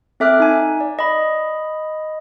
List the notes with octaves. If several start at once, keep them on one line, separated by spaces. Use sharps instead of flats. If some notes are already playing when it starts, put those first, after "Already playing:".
C4 A4 E5 D6 F6 F#6
D#4 G#5
D5
D#5 B5